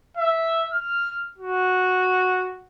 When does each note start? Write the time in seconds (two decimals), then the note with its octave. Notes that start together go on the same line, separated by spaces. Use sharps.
0.17 E5
0.73 F6
1.38 F#4